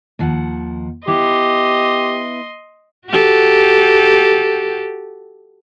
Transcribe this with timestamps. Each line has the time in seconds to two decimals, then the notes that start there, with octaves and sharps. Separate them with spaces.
0.19 D#2 F3 F#5
1.07 B3 E4 G4 D#5 C6
3.08 F#4 G4 A4